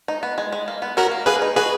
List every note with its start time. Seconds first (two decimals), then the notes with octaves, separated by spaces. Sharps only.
0.08 D#4
0.23 B3
0.38 G#3
0.52 G#3
0.68 A#3
0.82 B3
0.97 C#4 F#4 A#4
1.12 A#3
1.26 A#3 G#4 B4
1.42 D#4
1.56 F#4 G#4 B4